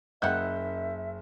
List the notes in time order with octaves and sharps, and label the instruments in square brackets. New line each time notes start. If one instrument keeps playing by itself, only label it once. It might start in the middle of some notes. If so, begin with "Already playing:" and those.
[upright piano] F#1 G6 [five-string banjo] D#3 E4 F#5 [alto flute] E5